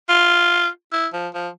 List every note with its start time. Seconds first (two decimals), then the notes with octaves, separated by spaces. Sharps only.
0.09 F4
0.93 E4
1.13 F3
1.34 F3